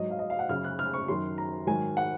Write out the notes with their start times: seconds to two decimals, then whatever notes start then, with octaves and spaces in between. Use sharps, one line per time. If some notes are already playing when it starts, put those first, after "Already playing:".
Already playing: G#2 F#3 D#5
0.10 F5
0.19 D#5
0.30 F5
0.39 F#5
0.49 F#2 C#3 F#3 F6
0.64 F#6
0.79 F6
0.94 C#6
1.08 F#2 D#3 F#3 C6
1.38 A#5
1.67 G#2 D#3 F#3 G#5
1.97 F#5